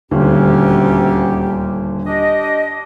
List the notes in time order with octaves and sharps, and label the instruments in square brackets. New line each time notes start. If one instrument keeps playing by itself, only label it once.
[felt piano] D#1 D3 [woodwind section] D2 C#4 G4
[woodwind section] D4 G4 D#5